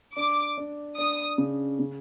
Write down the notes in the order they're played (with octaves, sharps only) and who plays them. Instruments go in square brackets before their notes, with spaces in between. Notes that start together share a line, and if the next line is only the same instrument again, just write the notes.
[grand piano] D4 [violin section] D6
[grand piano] D4
[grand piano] D4 [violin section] D#6
[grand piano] C#3
C#3